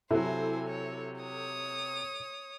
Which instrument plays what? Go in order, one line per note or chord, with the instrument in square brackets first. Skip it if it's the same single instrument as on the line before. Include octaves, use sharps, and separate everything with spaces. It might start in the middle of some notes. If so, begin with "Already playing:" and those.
[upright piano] C3 F#3 [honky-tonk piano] E4 A4 [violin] C5 G#5
[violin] C#5
C#5 D#6